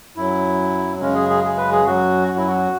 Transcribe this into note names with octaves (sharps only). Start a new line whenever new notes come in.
F#2 F#3 E4
F#2 C#3 G#3 C#4
G#4
G#4
G#4
B4
G#4
F#2 F#3 F#4
F#4
E4
F#4